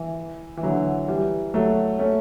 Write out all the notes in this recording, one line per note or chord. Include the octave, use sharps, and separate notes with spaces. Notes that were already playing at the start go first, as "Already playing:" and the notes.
Already playing: E3
E3
D3 F#3
E3 G3
F#3 A3
A3 C#4